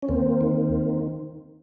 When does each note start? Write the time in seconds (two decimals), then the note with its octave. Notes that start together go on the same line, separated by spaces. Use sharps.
0.02 C#4
0.09 D#2 A#3 C4
0.41 D#3